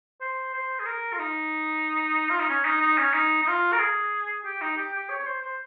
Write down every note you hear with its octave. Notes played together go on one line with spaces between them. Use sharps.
C5
C5
G#4
A#4
F4
D#4
F4
D#4
C#4
D#4
D#4
C#4
D#4
D#4
F4
A#4
G#4
G4
D#4
G4
G4
C#5
C#5
C5
C5